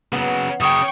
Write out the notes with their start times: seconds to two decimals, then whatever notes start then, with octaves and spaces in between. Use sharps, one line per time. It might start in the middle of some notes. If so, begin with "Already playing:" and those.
0.13 C#3 F#3 B3
0.60 F#2 C#3 G5 C#6 D#6